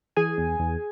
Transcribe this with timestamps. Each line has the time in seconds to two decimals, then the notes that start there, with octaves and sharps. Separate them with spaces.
0.17 E3 G#4 G#5
0.38 E2
0.59 E2